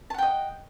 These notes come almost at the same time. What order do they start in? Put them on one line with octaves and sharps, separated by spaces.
A5 F#5 G5 D#5